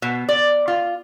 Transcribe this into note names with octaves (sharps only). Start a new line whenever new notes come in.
B2
D5
F4